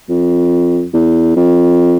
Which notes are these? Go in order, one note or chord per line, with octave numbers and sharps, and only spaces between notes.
F2
E2
F2